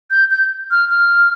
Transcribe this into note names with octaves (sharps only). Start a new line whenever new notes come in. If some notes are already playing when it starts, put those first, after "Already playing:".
G6
G6
F6
F6